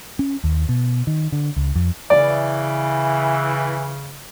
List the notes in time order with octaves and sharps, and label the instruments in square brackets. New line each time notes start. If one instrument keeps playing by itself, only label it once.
[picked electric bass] C#4
D#2
B2
D#3
D3
C#2
F2
[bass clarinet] C#3 [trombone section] E3 [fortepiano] D5